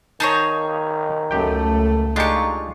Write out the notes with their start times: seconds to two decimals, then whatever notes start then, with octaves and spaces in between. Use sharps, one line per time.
0.20 D#3 D#4 G#4 C#5 A5 A#5
1.31 C#2 F#2 A3 G4 G5
2.16 G#3 D4 D#4 F4 G4 C#6